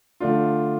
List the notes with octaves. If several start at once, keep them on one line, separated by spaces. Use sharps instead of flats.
D3 A3 D4 F4